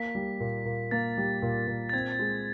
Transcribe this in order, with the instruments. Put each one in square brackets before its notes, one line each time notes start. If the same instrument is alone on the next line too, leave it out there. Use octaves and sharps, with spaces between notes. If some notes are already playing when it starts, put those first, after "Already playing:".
Already playing: [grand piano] A#3 [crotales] B6
[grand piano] G3
A#2
A#2
[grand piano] A#3 [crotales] A6
[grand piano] G3
A#2
A#2
[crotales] A6
[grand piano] C4 [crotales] G#6
[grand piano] G#3